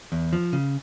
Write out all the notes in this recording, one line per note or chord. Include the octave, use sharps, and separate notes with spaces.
E2
F3
C#3